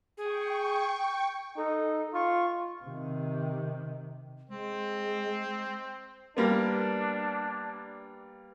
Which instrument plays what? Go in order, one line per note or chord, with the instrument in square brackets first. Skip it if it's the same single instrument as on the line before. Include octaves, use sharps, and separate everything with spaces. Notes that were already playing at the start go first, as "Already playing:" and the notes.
[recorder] G#4 [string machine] G5 C#6
[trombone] D#4 [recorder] A4
[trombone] F4 [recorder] C#6
[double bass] C3 D#3
[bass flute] G#3 [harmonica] C4
[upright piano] G3 A#3 B3 [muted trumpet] D4